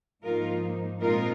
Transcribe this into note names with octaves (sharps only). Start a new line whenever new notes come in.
G#2 F3 A#3 D#4 F4 A#4
A#2 G#3 C4 D#4 F4 A#4